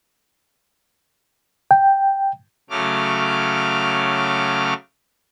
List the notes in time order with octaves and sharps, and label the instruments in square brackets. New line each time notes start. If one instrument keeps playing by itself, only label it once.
[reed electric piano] G5
[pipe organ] C#3 F#3 A3 D6 F6